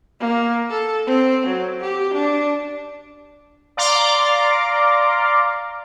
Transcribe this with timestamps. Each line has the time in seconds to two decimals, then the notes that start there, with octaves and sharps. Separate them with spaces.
0.20 A#3
0.70 A4
1.07 C4
1.46 F#3
1.80 G4
2.14 D4
3.77 D5 F5 A#5 C6 D6